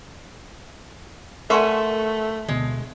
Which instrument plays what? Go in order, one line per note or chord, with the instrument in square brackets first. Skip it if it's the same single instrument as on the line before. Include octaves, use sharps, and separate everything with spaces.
[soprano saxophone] A3 [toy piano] A#4 C6 C#6 [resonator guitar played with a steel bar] E5 F#5 G#5
[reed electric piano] D2 B2 [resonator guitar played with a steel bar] G#3